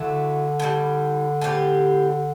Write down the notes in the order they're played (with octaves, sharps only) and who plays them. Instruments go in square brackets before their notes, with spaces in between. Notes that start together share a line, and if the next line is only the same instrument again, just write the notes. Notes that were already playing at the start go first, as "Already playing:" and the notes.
Already playing: [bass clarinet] D3 [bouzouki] F#3 A3 E4
[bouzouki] A2 E3 G3
A2 G3 C4 G4